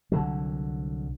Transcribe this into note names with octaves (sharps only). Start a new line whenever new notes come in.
C2 D3 F#3